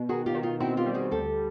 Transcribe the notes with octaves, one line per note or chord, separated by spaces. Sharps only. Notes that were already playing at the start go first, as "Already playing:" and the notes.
Already playing: B2
D#3 F#4 G#4
F4 G4
D#3
D#4 F4
C4 E4 F#4
F4 G4
G3
F#4 G#4
D2 G4 A4